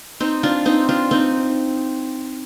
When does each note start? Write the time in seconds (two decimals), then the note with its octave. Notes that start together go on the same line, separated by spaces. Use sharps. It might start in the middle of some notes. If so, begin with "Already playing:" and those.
0.20 C4 D#4
0.43 D4 F4
0.66 C4 D#4
0.89 D4 F4
1.11 C4 D#4